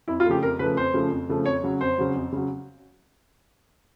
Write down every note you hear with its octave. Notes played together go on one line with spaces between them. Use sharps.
F2 E4
F4
C#3 F3 A3 G4
F2 A#4
C#3 F3 A3 B4
F2 C5
C#3 F3 A3
F2
C#3 F3 A3
F2 C#5
C#3 F#3
F2 C5
C#3 F#3
F2
C#3 F#3